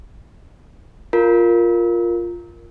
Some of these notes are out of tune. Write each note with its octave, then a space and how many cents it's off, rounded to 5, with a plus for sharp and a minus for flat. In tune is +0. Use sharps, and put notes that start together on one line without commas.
F4 +0 A#4 +0